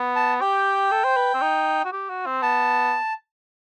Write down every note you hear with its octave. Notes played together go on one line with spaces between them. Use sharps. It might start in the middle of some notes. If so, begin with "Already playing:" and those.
Already playing: B3
A5
G4 G5
A4
C5
B4
C4
D#4
F#4
G4
F#4
C4
B3 A5